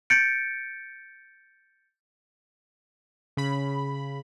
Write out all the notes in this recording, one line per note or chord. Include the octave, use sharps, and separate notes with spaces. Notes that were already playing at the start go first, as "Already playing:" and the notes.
G6 A6 C#7 D7
C#3 B5